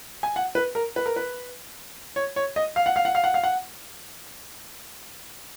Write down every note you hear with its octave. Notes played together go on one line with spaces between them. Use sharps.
G#5
F#5
B4
A#4
B4
A#4
B4
C#5
C#5
D#5
F5
F#5
F5
F#5
F5
F#5
F5
F#5